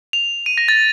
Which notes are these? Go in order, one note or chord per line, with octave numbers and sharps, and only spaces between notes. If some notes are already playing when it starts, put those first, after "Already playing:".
F7
D#7
A#6
A6